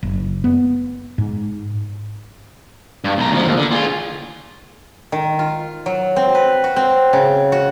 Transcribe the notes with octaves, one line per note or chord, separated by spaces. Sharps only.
F#1
B3
G#2
G2
B1 A#5
D2 F3
D#2
D3
F4 G#4
D#3
F4
F#3
C4
B4
F#4
C4
C#3
F#4